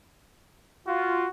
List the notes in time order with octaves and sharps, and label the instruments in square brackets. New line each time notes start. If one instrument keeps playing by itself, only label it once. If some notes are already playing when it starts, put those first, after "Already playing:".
[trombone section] F4 [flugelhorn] F#4